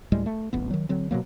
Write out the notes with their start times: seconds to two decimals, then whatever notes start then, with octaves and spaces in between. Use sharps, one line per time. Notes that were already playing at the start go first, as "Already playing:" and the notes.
0.12 D2 A2 G3 G#3
0.26 A3
0.53 D1 A1 B3
0.71 D#3 F#3
0.89 D3 F#3 C4
1.11 B2 D3 F#3 A#3